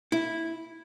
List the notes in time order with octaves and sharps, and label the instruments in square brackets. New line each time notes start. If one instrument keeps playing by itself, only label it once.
[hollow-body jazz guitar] E4